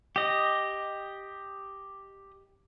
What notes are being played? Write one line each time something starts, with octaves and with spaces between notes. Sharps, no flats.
G4 D#5